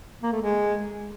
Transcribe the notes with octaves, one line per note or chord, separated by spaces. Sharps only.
A#3
A3
G#3